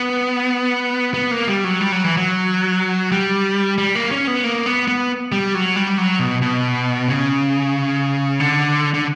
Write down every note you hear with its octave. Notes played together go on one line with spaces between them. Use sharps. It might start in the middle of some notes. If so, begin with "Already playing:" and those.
Already playing: B3
B3
A#3
G3
F#3
G3
F#3
E3
F#3
G3
G3
A#3
C#4
B3
A#3
B3
B3
G3
F#3
G3
F#3
B2
B2
C#3
D3
D3